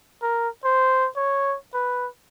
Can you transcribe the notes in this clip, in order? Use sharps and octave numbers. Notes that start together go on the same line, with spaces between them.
A#4
C5
C#5
B4